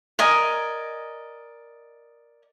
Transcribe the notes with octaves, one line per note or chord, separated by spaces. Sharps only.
A#4 D5 D#5 G#5